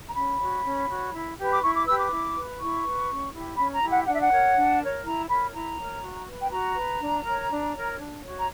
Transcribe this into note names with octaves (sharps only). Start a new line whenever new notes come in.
A#5
C#4 B5
F#4 C#5
C#4
F#4 C#5
E4
G4 B4
D6
E4 C#6
D6
G4 B4 E6
D6
E4
B4
E4 C#6
B4
C#4
E4 G4
C#4 B5
A#5
E4 G4
F#5
D4 F#5
E5
F#5
A#4 C#5
D4
A#4 C#5
E4 A#5
A#4 C#5 B5
E4 A#5
A#4 C#5
F#4
B4
G5
F#4 A#5
B4
D4
A#4 C#5
D4
A#4 C#5
D4
F#4 C#5
A#5